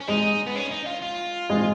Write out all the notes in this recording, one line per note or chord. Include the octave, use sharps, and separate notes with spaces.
C#4
G#3 D#4
B3
C#4
D#4
F4
F4
G#3